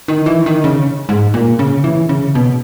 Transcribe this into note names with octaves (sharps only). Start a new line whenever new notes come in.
D#3
E3
D#3
C#3
G#2
A#2
C#3
E3
C#3
B2